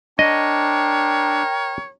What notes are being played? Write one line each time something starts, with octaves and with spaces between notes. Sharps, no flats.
D4 A#4 C#5 D#5 G5